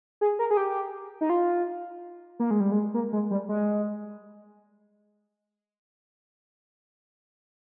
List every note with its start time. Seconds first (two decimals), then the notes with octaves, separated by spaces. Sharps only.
0.21 G#4
0.39 A#4
0.51 G#4
0.57 G4
1.21 D#4
1.30 F4
2.40 A#3
2.51 G#3
2.60 G3
2.72 G#3
2.94 A#3
3.13 G#3
3.31 G3
3.49 G#3